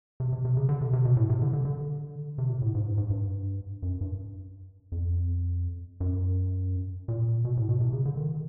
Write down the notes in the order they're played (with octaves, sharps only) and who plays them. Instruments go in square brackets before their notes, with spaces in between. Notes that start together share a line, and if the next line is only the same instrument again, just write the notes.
[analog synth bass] C3
C3
C3
C#3
D3
C3
C3
B2
A2
C3
D3
D3
D3
C3
A#2
A2
G#2
G2
G#2
G2
F#2
G2
F2
F#2
A#2
B2
A2
B2
C3
C#3
D3
D#3